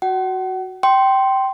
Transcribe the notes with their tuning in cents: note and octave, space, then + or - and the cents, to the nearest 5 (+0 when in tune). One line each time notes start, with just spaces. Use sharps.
F#4 +0 F#5 +35
G5 -15 C6 +0